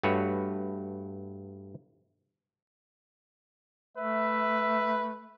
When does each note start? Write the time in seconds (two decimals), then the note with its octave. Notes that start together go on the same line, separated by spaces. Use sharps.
0.03 G2 A3 F#4 B4 C#5
3.97 A3 B4 E5